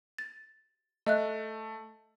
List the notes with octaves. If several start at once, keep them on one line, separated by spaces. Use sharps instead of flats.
A6
A3 D#5 E5 F#6